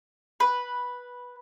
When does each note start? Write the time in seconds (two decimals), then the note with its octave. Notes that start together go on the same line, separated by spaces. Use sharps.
0.40 B4